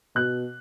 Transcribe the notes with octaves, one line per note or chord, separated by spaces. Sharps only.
B2 F#6